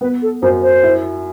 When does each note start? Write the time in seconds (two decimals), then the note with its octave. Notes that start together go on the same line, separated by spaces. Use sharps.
0.01 B3 B4
0.22 A4
0.42 F#2 C5
0.62 C5
0.83 E4